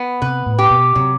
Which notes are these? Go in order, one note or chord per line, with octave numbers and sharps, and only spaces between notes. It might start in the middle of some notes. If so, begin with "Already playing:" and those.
Already playing: B3
C3 B4
A2
G4
B2
C3 F#3